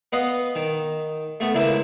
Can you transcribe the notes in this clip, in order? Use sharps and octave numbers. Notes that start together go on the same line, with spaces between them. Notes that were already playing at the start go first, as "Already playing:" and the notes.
B3 B4 D#5 F5
D#3
A3 B3
C#2 A#3 E4 B4 E5